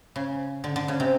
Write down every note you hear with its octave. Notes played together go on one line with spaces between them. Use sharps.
C#3
D3
D3
C#3
C3